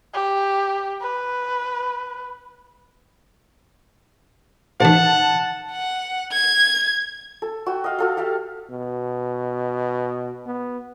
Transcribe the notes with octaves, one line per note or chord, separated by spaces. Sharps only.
G4
B4
A1 D#3 F#5 A5
F#5
G#6
A4
F#4 G5
D#5 F5
F#4 A4 F5
G4 F5 G5 A5
B2
B3